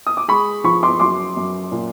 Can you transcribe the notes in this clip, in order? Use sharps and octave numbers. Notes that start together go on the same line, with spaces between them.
D#6
D6
G#3 B5 C#6
F3 B5 C#6
C6 D6
F#2 C6 D6
F#2
A#2